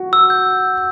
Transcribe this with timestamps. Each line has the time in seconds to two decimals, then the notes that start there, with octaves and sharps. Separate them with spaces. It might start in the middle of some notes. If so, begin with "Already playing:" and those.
Already playing: F#4
0.13 E6
0.30 G6